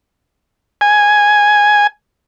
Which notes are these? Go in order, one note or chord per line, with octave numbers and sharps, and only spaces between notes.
G#5